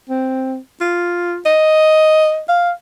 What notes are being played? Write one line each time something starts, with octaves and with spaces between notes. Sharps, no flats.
C4
F4
D#5
F5